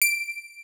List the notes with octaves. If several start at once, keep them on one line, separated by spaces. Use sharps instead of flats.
D7